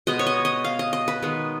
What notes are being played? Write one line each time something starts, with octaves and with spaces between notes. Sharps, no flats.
B2 G#3 B3 D#5
C#5
D#5
D#5
F5
D#5
D#5
B4
D#3 G#3 B3